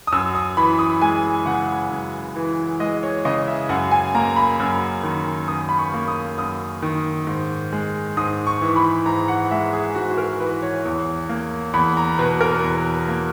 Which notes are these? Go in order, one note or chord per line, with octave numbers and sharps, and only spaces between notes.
D#6
F#2 E6
D#6
E3 B5
D#6
G#3 G#5
C#3 F#5
F#2
E3
G#3 D#5
C#5
C#3 D#5
E5
F#2 F#5
G#5
A#3 A#5
B5
F#2
D#3
F#2 D#6
B5
C#6
A#3
D#6
F#2 D#6
D#3
G#2
G#3
G#2 D#6
C#6
E3
B5
G#2 A#5
F#5
G#3 E5
G#4
G#2 F#4
A#4
E3 B4
C#5
E2
A#3
E2 B5
A#5
B2 B4
A#4
E2
A#3